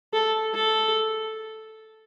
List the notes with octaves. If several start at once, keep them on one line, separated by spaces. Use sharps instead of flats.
A4
A4